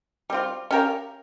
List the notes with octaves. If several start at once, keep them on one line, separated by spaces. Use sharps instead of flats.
G3 C4 F4
C#4 G4 A#4 F5